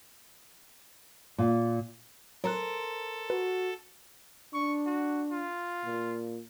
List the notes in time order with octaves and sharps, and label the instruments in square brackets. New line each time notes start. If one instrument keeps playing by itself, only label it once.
[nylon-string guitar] A#2
[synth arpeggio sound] F#3 A#5 F#6 [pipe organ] A4 [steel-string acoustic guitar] A#4 C5
[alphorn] F#4 [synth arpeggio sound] B4
[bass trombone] D4 [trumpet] C#6
[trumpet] F#4
F4
[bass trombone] A#2